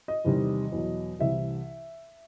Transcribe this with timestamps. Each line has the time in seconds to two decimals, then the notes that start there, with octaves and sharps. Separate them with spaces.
0.08 D#5
0.25 E2 C3 D#3 G3
0.72 E2 B2 F#3
1.19 C2 C3 E3 E5